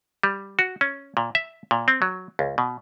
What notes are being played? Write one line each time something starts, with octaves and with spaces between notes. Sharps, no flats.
G3
F#4
C#4
A#2
E5
A#2
C4
F#3
C#2
B2